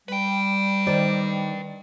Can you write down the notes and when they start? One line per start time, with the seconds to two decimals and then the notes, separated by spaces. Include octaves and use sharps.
0.08 G3 B4 G5
0.87 D#3 C5 D5